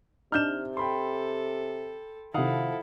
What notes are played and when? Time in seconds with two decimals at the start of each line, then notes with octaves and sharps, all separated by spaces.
0.32 C3 D4 D#4 F6 G6 E7
0.77 A4 G5 B5 C6
2.34 C3 D#3 F3 E4 A4 F5 F#5 D#6